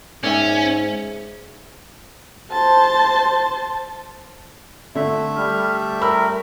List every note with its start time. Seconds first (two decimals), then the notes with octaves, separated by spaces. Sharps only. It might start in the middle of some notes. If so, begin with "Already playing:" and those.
0.23 G#2 C#4 D5 E5 G#5
2.52 C5 A5
4.95 D3 A3 E5
5.38 G3 F6
6.02 A#4 B5 E6